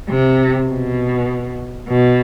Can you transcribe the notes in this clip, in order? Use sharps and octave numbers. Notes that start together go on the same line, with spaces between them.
C3
B2
B2